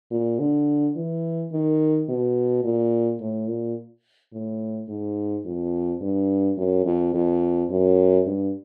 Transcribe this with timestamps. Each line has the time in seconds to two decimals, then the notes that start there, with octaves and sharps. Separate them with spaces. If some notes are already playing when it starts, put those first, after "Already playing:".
0.11 A#2
0.40 D3
0.96 E3
1.52 D#3
2.09 B2
2.64 A#2
3.21 A2
3.49 A#2
4.33 A2
4.89 G#2
5.45 F2
6.01 G2
6.58 F#2
6.85 F2
7.14 F2
7.70 F#2
8.26 G2